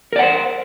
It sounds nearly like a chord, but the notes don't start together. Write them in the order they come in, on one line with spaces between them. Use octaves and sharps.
A#4 D5 F#5 C5